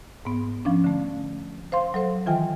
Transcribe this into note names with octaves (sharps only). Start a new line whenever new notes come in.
G#2 B3
F3 C#4 D4
D3 A3
C5 F5 C6
F#3 A4 C5
D#3 E3 F4 G5 G#5